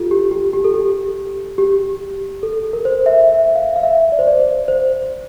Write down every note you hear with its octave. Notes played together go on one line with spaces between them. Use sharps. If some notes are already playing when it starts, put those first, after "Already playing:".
Already playing: F4 G4 A4
G4
G4
G4
A4
G4
G4
A4
A#4
C5
E5
E5
F5
F5
E5
D5
C5
D5
C5
C5